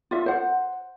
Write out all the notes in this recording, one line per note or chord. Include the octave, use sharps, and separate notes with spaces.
F4 E5
C5 F#5